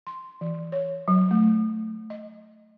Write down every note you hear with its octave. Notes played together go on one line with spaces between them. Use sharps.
C6
E3
C#5
F#3
A3
D#5